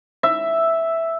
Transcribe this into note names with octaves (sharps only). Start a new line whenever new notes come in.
E5